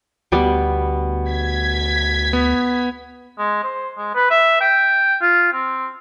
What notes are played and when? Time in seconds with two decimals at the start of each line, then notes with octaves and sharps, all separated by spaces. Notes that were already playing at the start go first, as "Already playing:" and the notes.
0.32 D2 B2 G3 B3
1.30 G#6 B6
2.33 B3
3.38 G#3
3.63 C5
3.98 G#3
4.15 B4
4.31 E5
4.61 G5
5.22 F4
5.53 C4